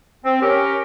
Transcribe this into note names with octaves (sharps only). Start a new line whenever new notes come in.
C4
C#4 G4 A#4